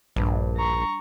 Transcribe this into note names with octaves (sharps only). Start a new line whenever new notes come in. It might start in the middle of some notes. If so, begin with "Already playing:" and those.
A#1 G2
A#5 C#6